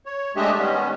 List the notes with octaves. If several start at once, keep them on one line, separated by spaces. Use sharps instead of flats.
C#5
G#3 A3 D4 G4 D#5 E5
D#3 G3 B3 C#4